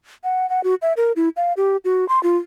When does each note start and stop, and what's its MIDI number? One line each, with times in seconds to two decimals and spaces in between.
0.24 0.49 78
0.50 0.63 78
0.64 0.75 66
0.82 0.93 76
0.97 1.12 70
1.16 1.29 64
1.37 1.53 77
1.57 1.77 67
1.85 2.07 66
2.09 2.21 84
2.23 2.37 65